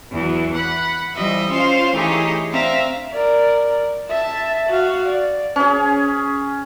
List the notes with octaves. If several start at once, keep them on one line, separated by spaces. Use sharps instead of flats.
E2 E3 F#3
F#5 B5
E3 F3 G3 D#5 E5
C#4 F4 C5 F5 C6
E3 A3 D#4 G4 G#4 C#5
C4 D4 E5 F5 A#5
A#4 D5
E5 A5
F#4 F5
D5
C#4 G#4